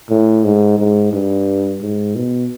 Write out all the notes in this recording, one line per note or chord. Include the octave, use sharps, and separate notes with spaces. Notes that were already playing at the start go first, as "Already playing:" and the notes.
A2
G#2
G#2
G2
G#2
B2